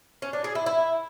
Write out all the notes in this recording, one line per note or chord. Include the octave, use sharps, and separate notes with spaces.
C#4
D4
G#4
E4
E4